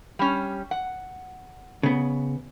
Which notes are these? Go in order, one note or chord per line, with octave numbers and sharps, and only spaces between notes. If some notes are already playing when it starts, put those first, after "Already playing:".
G3 C#4
F#5
C#3 B3